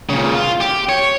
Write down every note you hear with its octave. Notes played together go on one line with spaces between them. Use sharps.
A#2 C#3
F4
G4
C#5